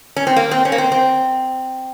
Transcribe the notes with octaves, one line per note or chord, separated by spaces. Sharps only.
C#4
C4
A#3
C4
C#4
A#3
C4
C4